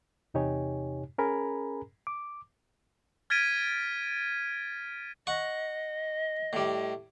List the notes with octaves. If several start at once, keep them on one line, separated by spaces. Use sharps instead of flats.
E2 C3 D#4 G4 C#5 G#5
C#4 G#4 A#4 G#5 A#5 B5
D6
F6 G#6 A6 B6 D7 D#7
D#5 F#5 C#6
A2 G3